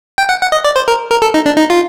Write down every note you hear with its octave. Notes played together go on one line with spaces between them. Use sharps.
G5
F#5
F#5
D#5
D5
C5
A#4
A#4
A4
D#4
D4
D#4
F4